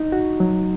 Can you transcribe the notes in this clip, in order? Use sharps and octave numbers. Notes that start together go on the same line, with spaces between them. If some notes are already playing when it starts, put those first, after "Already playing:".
Already playing: D#4
F#4
F#3